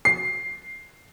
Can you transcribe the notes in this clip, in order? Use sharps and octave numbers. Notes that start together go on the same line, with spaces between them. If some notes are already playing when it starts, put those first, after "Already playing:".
C7